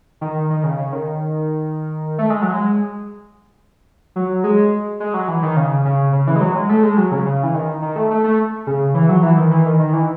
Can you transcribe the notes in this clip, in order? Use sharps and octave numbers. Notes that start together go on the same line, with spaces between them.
D#3
D#3
C#3
C#3
D#3
A3
G#3
F#3
G#3
F#3
G#3
G#3
F#3
E3
D#3
C#3
C#3
C#3
E3
G#3
F#3
G#3
A3
G#3
F#3
C#3
C#3
E3
D#3
D#3
A3
A3
A3
C#3
E3
F#3
E3
D#3
E3
D#3
D#3
E3